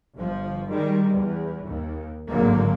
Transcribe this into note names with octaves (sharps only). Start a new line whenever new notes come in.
G1 F3
D#3 G3 G#3
E2
D#2
G#1 A2 D3 F#3 G#3 A#3